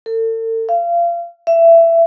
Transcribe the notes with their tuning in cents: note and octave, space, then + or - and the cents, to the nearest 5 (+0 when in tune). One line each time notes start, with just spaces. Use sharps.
A4 +40
F5 -30
E5 +20